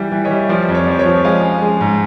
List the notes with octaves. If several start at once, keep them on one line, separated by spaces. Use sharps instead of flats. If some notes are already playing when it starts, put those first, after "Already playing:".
Already playing: E3 G3
E3
C#5 D#5
G3
F3 C5 D5
F2
C#5
F3
C#5
F3
G#3 D#5 F5
C#4
G#3
G#2